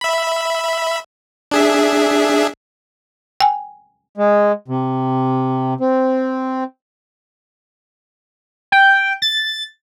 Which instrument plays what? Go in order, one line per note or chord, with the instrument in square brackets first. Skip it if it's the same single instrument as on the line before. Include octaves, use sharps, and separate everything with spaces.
[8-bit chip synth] E5 B5
D4 G#4 E5
[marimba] G5 G#5
[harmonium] G#3
C3
C4
[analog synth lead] G5
A6